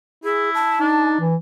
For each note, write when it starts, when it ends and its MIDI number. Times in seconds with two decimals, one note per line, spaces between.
0.24 0.79 64
0.24 0.50 68
0.54 1.13 81
0.80 1.28 62
0.80 1.19 63
1.20 1.36 52